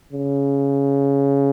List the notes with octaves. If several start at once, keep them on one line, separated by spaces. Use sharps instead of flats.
C#3